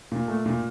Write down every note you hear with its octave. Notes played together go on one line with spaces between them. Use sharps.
A#2
A3
A#2